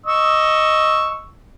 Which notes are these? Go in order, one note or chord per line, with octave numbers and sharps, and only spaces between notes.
D#5 C#6 E6